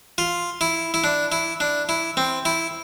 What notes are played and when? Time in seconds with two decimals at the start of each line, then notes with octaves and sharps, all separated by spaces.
0.18 F4
0.61 E4
0.94 E4
1.04 D4
1.32 E4
1.60 D4
1.89 E4
2.17 C4
2.45 E4